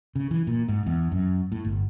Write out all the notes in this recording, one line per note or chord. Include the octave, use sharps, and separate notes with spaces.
C#3
E3
A#2
G#2
E2
F#2
A2
G1